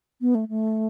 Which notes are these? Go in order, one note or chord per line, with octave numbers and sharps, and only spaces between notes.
B3
A3
A3